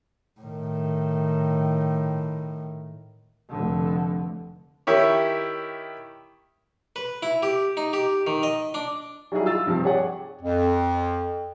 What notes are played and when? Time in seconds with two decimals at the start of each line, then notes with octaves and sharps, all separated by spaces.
0.40 A2 D#3
3.50 F1 D3
4.87 D#3 E4 G4 C#5
6.96 B4
7.23 E4
7.43 G4
7.77 D#4
7.93 G4
8.27 D#3
8.43 D#5
8.74 D4
9.32 F#3 G3 D#4 E4 F#4 G#4
9.46 F4 E6 A6
9.67 G2 C3 F3
9.83 G4 G#4 C#5 D5 F#5
10.42 F2